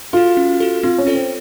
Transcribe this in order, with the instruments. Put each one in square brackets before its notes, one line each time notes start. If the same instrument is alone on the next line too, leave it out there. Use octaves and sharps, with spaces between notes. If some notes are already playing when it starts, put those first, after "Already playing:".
[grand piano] F4 [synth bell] F#4 A4
[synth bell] C#4
F#4 A4
[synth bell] C4 [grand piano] F4
[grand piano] C#4
[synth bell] F4 A4 C#5
[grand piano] C4